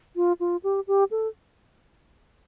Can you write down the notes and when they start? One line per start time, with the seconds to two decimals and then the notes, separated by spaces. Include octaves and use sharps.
0.16 F4
0.40 F4
0.64 G4
0.87 G4
1.11 A4